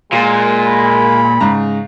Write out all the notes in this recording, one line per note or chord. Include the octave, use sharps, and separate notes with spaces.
A#2 G#3
B5
G#2 C#3 A#5